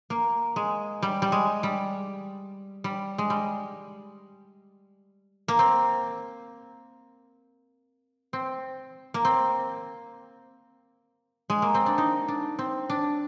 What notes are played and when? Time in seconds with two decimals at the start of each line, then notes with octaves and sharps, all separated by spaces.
0.10 A#3
0.56 G#3
1.02 G3
1.22 G3
1.32 G#3
1.63 G3
2.84 G3
3.18 G#3
3.30 G3
5.48 A#3
5.59 C4
8.33 C4
9.14 A#3
9.25 C4
11.50 G#3
11.62 A#3
11.74 C4
11.86 D4
11.98 D#4
12.28 D4
12.59 C4
12.90 D4